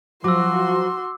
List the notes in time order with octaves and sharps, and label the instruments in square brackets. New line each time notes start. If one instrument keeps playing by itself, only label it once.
[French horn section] F3 [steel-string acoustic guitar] F#3 [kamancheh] F#4 C6 [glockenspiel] D6 E6